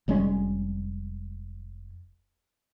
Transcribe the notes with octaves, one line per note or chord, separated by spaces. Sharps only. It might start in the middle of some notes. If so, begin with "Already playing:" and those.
F1 G3 G#3 C#4